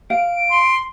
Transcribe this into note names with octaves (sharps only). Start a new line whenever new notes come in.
F5 D7
C6